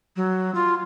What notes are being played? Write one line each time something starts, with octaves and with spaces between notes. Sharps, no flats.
F#3
F4